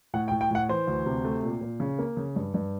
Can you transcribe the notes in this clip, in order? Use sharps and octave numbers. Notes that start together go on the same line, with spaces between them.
A2 F#5
G5
A2
G5
A2 F#5
E3 C5
D2
C3
A3
A#2
A#2
C#3
A#3
C#3
G2
G2